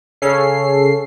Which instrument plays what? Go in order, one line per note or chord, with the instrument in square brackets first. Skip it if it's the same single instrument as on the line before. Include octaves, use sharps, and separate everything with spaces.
[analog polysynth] C#3 C#4 A4 C7